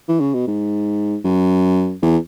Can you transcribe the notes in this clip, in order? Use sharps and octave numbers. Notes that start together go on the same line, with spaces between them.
E3
C#3
B2
G#2
F#2
E2